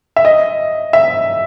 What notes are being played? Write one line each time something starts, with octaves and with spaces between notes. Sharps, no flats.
E5
D#5
E5